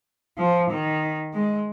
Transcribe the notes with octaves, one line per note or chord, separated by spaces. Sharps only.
F3
D#3
G#3